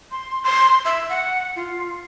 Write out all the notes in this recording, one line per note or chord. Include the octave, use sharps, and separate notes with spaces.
C6
C6
E5
F#5
F4